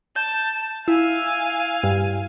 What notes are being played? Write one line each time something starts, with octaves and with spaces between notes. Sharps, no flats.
A5 G6
E4 F5 G#5 E6
G2